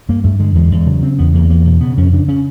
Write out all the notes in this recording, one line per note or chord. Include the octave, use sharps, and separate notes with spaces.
G2 A#3
G2 A3
D3 G#3
E2 G#3
E2
C#3 F#3
C#3 C4
E2 B3
E2 A#3
E2 A#3
B2
C#3 B3
F2 C#4
C#3 D4
C#3 C#4